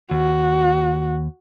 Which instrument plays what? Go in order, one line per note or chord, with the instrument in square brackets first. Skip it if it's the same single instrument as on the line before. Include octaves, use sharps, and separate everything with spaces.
[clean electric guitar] D#2 [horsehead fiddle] F#4